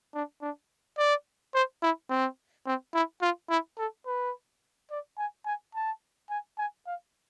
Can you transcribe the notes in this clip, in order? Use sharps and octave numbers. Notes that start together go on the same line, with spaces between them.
D4
D4
D5
C5
E4
C4
C4
E4
F4
E4
A4
B4
D5
G#5
G#5
A5
G#5
G#5
F5